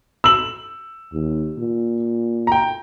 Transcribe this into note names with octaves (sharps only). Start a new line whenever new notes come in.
E6 F#7
D#2
A#2
G5 A#5